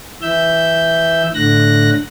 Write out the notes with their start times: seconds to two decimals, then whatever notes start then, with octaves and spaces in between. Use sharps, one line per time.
0.22 E3 E5 E6 G6
1.34 A2 D3 F#6 A#6